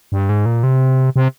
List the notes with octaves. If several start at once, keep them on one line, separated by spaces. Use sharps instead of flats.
G2
G#2
A#2
C3
C3